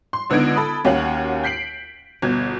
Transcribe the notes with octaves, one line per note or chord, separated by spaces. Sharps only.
C6
C#2 D3 B3 D#4 G#6 D7
A4 B5 D#6
D#2 C#4 F#4 C#5 F5 F#7
G6 B6 C7 D7 F#7
G1 B2 G#6